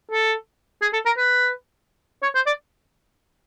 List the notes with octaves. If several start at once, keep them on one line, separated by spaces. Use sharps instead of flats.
A4
G#4
A4
A#4
B4
C#5
C5
D5